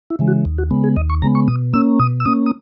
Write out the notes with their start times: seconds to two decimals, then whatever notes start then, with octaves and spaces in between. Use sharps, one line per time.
0.10 E4
0.19 C#3 E3 G#3
0.28 F#4
0.45 D#2
0.58 F#4
0.71 C#3 G#3 B3
0.84 G#4
0.96 D#2 D#5
1.10 C#6
1.22 C#3 G#3 B3 A#5
1.35 C#6
1.48 B2 D#6
1.73 A#3 C#4 E6
1.99 B2 D#6
2.20 E6
2.25 A#3 C#4 D#6
2.46 D#6